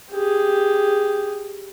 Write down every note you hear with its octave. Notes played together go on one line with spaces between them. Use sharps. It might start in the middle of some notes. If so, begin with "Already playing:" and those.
G4 G#4